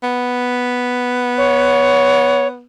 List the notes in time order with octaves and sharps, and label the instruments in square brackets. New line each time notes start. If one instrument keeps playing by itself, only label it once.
[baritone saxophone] B3
[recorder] C#5